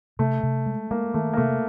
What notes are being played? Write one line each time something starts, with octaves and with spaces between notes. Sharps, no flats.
C3 A3
C3
G#3
G#3 A#3
D#3 A3
A#3
C3 A3